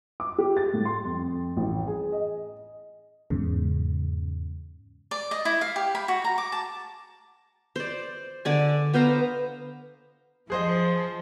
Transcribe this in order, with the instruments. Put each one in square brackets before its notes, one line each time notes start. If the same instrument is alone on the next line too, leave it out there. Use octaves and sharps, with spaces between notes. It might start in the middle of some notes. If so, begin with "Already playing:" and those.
[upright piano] D6
G4
A6
A2
C6
F2
A1
G#4
D#5
[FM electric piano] E2 G#2 C#3
[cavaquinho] D5
D#5
E4
F5
G4
B5
F#4
A#5
D6
A5
[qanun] C5 D5
D3 D5 G#5
B3 C5 F5 A#5
[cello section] F3 [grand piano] G#4 C5 D#5